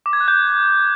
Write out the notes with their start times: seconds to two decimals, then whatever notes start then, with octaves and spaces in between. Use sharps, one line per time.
0.06 D6
0.13 G#6
0.21 F#6
0.28 G6